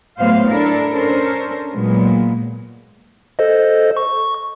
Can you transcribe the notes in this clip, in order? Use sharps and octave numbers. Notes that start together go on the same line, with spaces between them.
A2 F#3 B3 C5 F5
D4 E4 A4 A#4
C#4 D4 A4 A#4 C5
A#2 F#3 G#3 B3
A4 C5 D#5
C#6